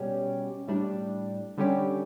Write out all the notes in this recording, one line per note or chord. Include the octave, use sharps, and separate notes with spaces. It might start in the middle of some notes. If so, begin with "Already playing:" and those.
Already playing: B2 G3 C#4 G4
A2 G3 D4
D3 G3 C#4 G4